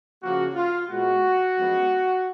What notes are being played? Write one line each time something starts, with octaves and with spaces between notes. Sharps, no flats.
C#3 F3 A#3 F#4
F4
A#2 G#3 B3 F#4
F#2 F3 G#3 B3